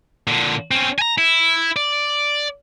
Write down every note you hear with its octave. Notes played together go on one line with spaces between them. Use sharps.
A#2 D3
C4 C#4
G#5 A#5
E4
D5